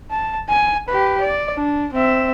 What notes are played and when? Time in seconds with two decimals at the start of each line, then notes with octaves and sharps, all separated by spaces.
0.11 A5
0.49 G#5
0.88 G4 B4
1.21 D5
1.54 D4
1.93 C4 E5